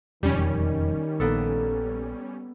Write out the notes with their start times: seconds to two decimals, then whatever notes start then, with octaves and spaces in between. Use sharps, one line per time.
0.23 E1 F2 D#3 G3 C#4
1.20 A#1 A#3 B3 A4